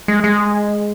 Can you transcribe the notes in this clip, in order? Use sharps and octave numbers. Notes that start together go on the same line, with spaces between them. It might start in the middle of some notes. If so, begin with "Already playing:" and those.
G#3
G#3